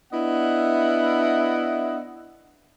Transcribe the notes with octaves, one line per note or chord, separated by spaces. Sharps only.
B3 D4 E4 D#5 E5 F#5